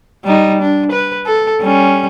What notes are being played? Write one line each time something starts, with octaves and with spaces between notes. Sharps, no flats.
G3 D#4
D4
B4
A4
G3 C#4